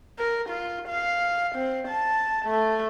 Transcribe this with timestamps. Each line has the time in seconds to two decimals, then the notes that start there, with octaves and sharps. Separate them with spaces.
0.19 A#4
0.49 F4
0.88 F5
1.55 C4
1.88 A5
2.45 A3